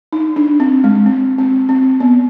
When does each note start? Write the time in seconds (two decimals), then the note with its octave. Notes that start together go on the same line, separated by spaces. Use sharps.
0.13 D#4
0.36 D4
0.60 C4
0.84 G#3
1.06 C4
1.38 C4
1.69 C4
2.00 B3